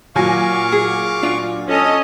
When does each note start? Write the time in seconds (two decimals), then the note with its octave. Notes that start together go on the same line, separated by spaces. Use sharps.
0.15 A#2 F#3 F5 G#5 C#6 D6
0.72 G#4
1.23 D4 F4
1.68 C#4 A4 D#5